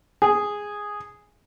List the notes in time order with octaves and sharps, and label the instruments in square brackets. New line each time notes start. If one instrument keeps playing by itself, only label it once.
[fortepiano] G#4